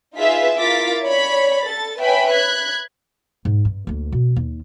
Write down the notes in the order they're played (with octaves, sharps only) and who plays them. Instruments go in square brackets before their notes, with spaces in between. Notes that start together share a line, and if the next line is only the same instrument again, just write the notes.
[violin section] D#4 F4 G#4 B4 E5 B6
E4 F4 A#4 D6 A6 B6
C#5 D5 B5
A4 A6
B4 C#5 E5 G5 G#5 B5
B5 F#6 G#6
[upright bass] G#2
G2
D2 A#3
B2
D#2